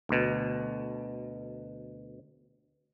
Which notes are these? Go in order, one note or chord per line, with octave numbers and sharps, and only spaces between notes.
D2 B2